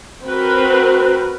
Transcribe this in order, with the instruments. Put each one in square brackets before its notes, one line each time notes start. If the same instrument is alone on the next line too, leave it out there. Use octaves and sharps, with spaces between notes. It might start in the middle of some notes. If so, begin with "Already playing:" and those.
[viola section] C4 F#4 A#4 B4